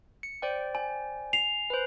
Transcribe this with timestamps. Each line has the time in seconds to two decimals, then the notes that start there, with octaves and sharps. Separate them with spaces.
0.23 C#7
0.42 C5 D5 G5
0.75 G#5
1.33 C7 F7
1.70 B4 C5